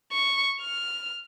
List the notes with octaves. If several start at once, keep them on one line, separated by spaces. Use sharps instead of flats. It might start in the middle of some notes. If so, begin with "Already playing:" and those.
C#6
F6